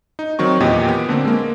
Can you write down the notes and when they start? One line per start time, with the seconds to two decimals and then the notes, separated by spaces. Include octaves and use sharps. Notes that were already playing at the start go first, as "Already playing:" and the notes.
0.19 D#4
0.39 D#3 F#3 C4 C#6
0.60 E2 A#2 G4 D#5
0.88 B3
1.09 D3 A3 A#3 C4
1.25 G#3 A#3